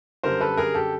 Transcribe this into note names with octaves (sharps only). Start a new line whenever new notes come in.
F#2 D3 G3 A#4 C5
A4 B4
G#4 A#4
G4 A4